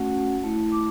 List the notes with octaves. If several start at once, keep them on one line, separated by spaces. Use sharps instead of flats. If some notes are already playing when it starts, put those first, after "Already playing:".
Already playing: A3 C#4 F#4 F#5
A3 E4
D6